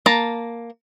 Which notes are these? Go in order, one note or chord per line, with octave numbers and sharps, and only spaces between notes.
A#3 A5 A#5